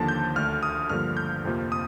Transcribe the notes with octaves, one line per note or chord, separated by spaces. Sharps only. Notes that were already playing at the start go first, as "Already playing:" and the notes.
Already playing: D#2 D3 F3 A#3 A5
G6
D2 D3 A3 F6
D#6
G2 D3 F3 A#3 F6
G6
F2 C3 F3 A#3
D#6